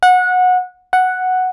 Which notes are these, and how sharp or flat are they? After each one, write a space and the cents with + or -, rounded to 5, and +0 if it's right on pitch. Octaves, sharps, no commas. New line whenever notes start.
F#5 -20
F#5 +0